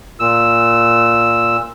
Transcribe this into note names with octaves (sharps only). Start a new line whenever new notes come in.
A#2 E6